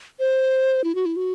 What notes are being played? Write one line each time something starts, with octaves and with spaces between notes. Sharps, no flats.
C5
E4
F#4
E4
F#4